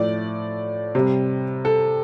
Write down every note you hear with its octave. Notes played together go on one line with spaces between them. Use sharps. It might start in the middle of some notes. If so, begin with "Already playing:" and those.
Already playing: A2 F3 A3 D5
C3 G3
A4